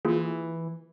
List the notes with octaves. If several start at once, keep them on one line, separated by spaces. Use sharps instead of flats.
E3 A#3 F4 G#4